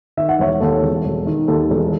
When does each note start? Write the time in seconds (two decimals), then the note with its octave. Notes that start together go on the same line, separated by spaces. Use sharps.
0.17 D#3 E5
0.29 F#5
0.39 E1 C#5 E5
0.60 D#2 A4 C#5
0.83 E1
1.05 E1
1.26 D#3
1.48 D#2 A4
1.70 E1 A4